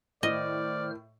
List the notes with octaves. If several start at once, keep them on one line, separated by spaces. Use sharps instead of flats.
A2 D#3 C5 D5 D#5 F6